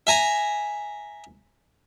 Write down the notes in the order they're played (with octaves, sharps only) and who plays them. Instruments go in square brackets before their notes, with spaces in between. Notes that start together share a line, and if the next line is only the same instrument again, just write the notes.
[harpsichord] E5 G#5 A#5